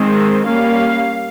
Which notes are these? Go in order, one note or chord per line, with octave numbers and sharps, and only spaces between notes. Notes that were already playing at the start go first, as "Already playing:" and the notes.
Already playing: D#3 G#3 C4
G3 A#3 C#4 F5